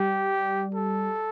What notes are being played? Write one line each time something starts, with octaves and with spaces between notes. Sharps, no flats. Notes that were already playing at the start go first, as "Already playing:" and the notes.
Already playing: G3 G4
A4